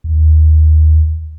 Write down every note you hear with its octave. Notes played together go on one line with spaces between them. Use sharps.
D#2